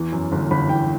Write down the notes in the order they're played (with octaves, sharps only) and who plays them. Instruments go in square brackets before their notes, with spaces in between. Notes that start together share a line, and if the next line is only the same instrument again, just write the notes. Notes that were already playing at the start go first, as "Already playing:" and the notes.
Already playing: [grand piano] E2 E3
F#2
G1
G1 B5
E3 G5